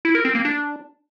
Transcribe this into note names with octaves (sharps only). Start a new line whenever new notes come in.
E4
A#4
C4
A#3
D4